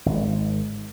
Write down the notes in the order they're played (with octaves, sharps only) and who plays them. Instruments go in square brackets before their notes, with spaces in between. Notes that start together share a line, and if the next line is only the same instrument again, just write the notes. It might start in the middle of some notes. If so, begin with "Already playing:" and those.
[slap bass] G#1